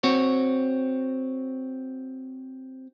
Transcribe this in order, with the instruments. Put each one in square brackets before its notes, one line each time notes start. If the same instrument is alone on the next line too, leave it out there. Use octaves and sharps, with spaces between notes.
[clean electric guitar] C4 F#4 C#5